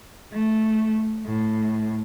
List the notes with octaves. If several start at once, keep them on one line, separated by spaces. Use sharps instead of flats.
A3
A2